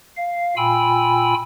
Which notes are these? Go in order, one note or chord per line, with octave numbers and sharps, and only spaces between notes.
F5
A#2 F4 G5 G#5 B5 E6